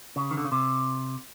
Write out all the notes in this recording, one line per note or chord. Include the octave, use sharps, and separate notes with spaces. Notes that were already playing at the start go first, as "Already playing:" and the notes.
C#3
D#3
D3
C#3
C3